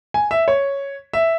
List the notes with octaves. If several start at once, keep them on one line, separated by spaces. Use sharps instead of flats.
G#5
E5
C#5
E5